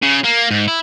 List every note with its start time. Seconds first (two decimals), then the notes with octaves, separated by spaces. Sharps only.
0.03 C#3
0.24 A#3
0.51 G#2
0.68 E4